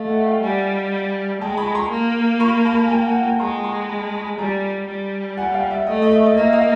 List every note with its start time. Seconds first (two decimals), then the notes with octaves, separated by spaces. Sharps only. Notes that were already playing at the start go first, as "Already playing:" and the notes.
Already playing: A3 D#5 F5
0.09 E5 F#5
0.26 F5 G5
0.42 G3 F#5 G#5
1.41 G#3 G5 A5
1.57 A5 B5
1.75 A#5 C6
1.91 A#3
2.40 B5 C#6
2.65 A5 B5
2.86 G#5
2.89 G5 A5
3.06 F#5 G#5
3.23 G5 A5
3.39 G#3 A#5 C6
3.64 A#5 C6
3.89 A5 B5
4.14 A5 B5
4.38 G3 G#5 A#5
4.88 G3
5.37 F#5 G#5
5.54 F5 G5
5.71 E5
5.87 A3 D#5
6.02 D#5
6.11 E5
6.26 D#5
6.37 A#3 E5
6.53 D#5 F5